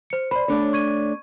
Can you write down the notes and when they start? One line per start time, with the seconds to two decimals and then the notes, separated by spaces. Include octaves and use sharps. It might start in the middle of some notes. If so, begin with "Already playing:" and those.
0.10 C5 C#7
0.31 C5 D5 B5
0.48 A3 D4 C#5
0.73 C#6 G#6 D#7